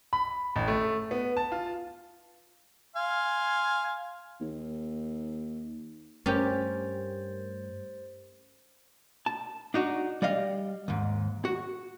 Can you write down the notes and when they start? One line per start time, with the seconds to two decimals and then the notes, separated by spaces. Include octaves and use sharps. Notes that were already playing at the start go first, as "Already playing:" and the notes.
0.13 B5
0.56 A1
0.68 A3
1.11 B3
1.37 A5
1.52 F4
2.96 F5 G#5 C6
4.41 D#2
6.26 G2 A3 C#4 G4 A#4 C5 A6
9.26 A5
9.74 D4 D#4 F#4
10.22 G3 D5 D#5 F5
10.88 D#2 G#2
11.45 F#4